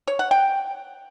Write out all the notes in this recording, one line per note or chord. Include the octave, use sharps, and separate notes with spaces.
C#5
F#5
G5